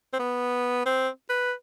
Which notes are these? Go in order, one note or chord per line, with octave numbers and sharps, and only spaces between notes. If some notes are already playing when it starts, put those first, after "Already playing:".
C4
B3
C4
B4